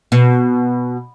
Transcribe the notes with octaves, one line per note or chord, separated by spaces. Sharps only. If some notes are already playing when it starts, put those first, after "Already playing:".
B2